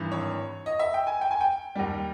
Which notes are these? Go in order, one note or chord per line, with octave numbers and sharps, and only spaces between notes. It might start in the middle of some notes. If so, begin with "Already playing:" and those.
Already playing: G#1 G2 E3
C#5
D#5
E5
G5
G#5
G5
G#5
G5
D#2 D#3 G3